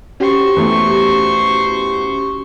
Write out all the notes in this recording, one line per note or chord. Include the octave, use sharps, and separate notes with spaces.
C#4 F#4 G4 C5 C#6
E2 A3